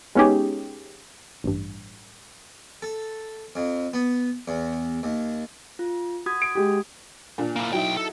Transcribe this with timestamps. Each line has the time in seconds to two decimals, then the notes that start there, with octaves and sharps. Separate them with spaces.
0.15 G#3 B3 C#4 D#4 G4 G#4
1.44 A1 G2
2.82 A4
3.56 F2
3.93 B3
4.48 E2
5.03 D#2
5.79 F4
6.26 F#4 D#6 G#6
6.42 D7
6.55 G#3 G4
7.38 A#2 D4
7.56 A#3 E4
7.73 B1 F#3 D#4 E4 G5
7.97 A4